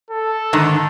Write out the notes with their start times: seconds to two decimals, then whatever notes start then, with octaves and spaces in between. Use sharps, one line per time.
0.10 A4
0.53 G#2 D3 D#3